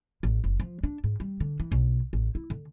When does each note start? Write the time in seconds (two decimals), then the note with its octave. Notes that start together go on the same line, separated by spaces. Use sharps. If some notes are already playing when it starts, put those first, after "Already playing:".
0.23 A1
0.44 F#1
0.60 F3
0.83 D4
1.04 G#2
1.20 G3
1.40 D3
1.60 E3
1.72 B1
2.13 A1
2.35 E4
2.50 D3